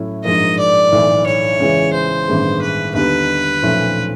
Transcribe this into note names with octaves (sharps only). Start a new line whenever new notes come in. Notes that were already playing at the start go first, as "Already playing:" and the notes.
Already playing: A2 F#3 A3 C#4 E4
A#1 G#2 F3 A#3 D#5
D5
B1 A2 E3 A3
C#5
C#2 C#3 E3 G#3
C5
A1 G2 D#3 G#3 B3
B4
D#2 D3 G3 B3 D#4 B4
B1 A#2 F3 A3 C#4